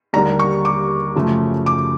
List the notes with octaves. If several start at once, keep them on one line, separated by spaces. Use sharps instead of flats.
D#2 D3 G3 A#3 A#5
C#6
D6
F#2 C#3 F3 A3
D6